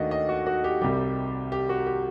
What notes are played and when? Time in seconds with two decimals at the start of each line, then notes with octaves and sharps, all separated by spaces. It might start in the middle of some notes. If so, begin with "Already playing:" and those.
Already playing: D#2 D#3 A3 D4 F#4 D#5
0.11 D#5
0.29 F#4
0.47 F#4
0.64 G4
0.81 C2 C3 G3 G4
1.52 G4
1.69 F#4
1.86 G4